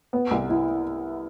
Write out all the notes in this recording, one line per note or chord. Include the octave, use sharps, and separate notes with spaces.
B3
C2
E4